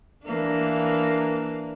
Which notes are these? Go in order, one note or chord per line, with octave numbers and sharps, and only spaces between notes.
E3 A#3 D4